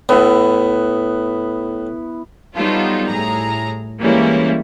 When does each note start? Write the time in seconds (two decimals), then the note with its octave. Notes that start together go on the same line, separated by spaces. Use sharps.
0.09 A2 B3 E4
2.54 F#3 G3 B3 D#4 F4 A4
3.07 A2 G#4 A#5
4.00 E3 G3 G#3 A#3 C#4 E4